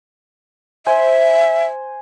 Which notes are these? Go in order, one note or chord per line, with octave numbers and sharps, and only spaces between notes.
C5 E5 G#5 C6